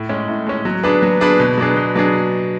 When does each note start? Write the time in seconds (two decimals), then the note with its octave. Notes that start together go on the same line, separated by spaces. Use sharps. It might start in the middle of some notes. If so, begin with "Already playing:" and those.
Already playing: A2
0.09 G#3 C#4
0.28 A2
0.47 G#3 C#4
0.65 F#3
0.83 B3 D4 G#4 B4
1.02 F#3
1.20 B3 D4 G#4 B4
1.40 B2
1.57 F#3 B3 D4 G#4
1.76 B2
1.95 F#3 B3 D4 G#4